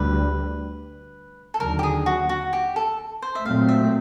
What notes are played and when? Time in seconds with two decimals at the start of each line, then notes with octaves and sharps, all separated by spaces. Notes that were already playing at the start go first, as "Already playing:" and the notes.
Already playing: D2 D3 G3 B4
1.54 A4
1.60 D#2 D3 F#3 A#4
1.79 G4
1.83 G#4
2.06 F#4
2.29 F#4
2.53 G4
2.76 A4
3.22 C5
3.35 E5
3.45 A#2 F#3 A3 C4 F5
3.69 E5